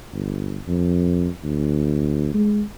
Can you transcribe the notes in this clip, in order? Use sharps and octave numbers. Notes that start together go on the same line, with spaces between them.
G1
F2
D2
G#3